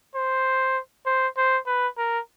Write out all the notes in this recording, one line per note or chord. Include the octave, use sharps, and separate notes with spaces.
C5
C5
C5
B4
A#4